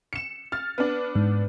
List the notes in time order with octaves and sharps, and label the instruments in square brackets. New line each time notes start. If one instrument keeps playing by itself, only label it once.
[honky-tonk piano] C#7 E7
F6 A6
B3 D4
[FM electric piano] G#2